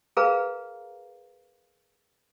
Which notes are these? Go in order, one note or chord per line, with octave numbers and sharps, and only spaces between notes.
G#4 A#4 B4 F5 A#5